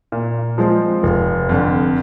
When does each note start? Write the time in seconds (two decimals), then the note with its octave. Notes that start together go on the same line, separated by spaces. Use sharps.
0.12 A#2
0.58 F3 G#3 C4
1.03 F1
1.49 F2 D3